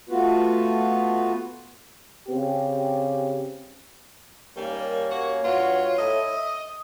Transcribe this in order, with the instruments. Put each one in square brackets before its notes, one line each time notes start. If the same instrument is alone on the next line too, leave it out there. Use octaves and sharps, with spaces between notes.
[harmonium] A3 B3 F4 F#4 B4
[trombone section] C#3 C4 G4
[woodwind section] D#2 C#4 [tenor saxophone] G3 [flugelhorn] A#3
[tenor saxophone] F#4 [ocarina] C#5
[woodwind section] G2 [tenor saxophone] F4 [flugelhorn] F#4
[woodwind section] A2 [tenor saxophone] D#5 [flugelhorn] E5
[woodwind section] D#6